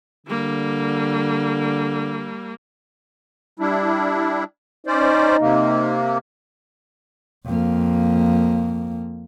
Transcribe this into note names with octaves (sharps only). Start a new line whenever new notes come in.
D3 G3 A#3
G3 D4 E4
C#4 D#4 C5 D5
C3 A#3
F2 A#3